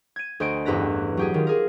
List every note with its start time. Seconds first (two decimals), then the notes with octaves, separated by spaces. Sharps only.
0.16 G#6 D#7
0.40 D2 C5 D#5 G#5 D7
0.65 A1 E2 G2 B4 A#5 A#6
1.17 F#3 G4 G#4
1.34 D#3 F4
1.47 G#4 A#4